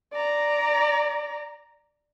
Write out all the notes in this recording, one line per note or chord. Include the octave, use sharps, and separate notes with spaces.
D5 A#5